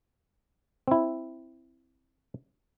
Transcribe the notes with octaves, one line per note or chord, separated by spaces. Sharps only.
C4 E4